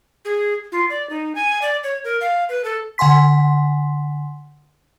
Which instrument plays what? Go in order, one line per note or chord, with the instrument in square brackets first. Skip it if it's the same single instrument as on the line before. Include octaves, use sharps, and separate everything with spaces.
[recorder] G#4
F4
D5
D#4
G#5
D5
C#5
A#4
F5
B4
A4
[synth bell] D3 F#5 G#5 C6 B6